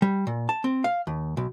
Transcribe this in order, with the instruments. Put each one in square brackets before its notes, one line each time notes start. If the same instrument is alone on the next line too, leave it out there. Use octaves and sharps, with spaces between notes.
[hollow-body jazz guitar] G3
A#2
A5
C4
F5
D#2
B1